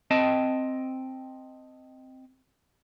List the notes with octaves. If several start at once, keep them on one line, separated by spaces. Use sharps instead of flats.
C4 D#5 G5 A5